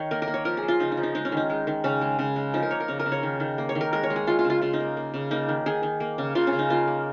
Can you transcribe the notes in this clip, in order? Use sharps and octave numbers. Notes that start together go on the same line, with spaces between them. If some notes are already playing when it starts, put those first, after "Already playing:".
Already playing: D#3 C#5
A#3 A#4
A#4
A#3
C#5
F3 A#4
G#4
F3
F4
C#3 D#4
D#4
F3
D#4
G#3 D#4
C#4
D#3 D#4
G#3
D#3
C#3 C#4
G#3
C#3
G#3
F3 D#4
A#4
A#3 C#5
A#4
C#3 C#5
A#4
C#3
C#5
D#3
D#3
A#3
C#5
D#3
A#4
G#3 A#4
C#5
G#3
G#4
G#3 F4
F4
C#3
F4
C#3 F4
D#4
A#3
A#3
C#3
A#3 D#4
D#3
D#3 G#4
D#3
A#3
C#3
C#3 F4
C#4
C#3
D#4
A#3 F4
A#3